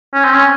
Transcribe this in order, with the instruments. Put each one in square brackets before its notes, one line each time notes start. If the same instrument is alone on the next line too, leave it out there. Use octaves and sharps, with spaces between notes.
[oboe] C#4
C4
C#4